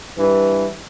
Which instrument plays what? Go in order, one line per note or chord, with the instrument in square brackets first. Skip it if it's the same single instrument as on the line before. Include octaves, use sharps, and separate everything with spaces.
[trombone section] G2 E3